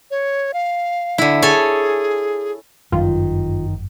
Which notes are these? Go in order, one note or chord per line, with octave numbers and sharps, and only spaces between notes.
C#5
F5
D3 E4
G#4 A4 C#5 G#5
G1 F#2 D#3 F4